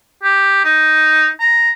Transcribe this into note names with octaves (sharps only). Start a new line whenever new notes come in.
G4
D#4
A#5